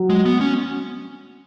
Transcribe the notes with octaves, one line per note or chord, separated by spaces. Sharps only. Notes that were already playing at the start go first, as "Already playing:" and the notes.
Already playing: F#3
G#3
B3
C#4